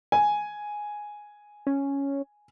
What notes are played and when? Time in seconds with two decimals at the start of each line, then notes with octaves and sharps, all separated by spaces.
0.12 G#5
1.67 C#4